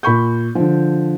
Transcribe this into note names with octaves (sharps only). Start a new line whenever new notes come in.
A#2 B5 C#6 G6
D3 F3